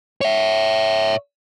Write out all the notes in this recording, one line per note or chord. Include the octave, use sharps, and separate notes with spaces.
C#5 E5